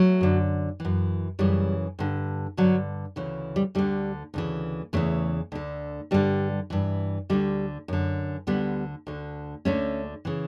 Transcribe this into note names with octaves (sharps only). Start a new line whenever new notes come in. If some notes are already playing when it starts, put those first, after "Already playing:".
Already playing: F#3 A3
F#2 D3
F#2 E3
F#2 C#3 E3 G3
G2 D3
G2 D3 F#3
D2 C#3 E3
G3
D2 D3 G3
D2 C#3 E3
E2 C#3 E3 F#3 A3
D2 D3
G2 D3 G3
G2 E3
D2 D3 G3
F#2 D3
D2 D3 G3 B3
D2 D3
D2 D3 A3 C#4
C#3 E3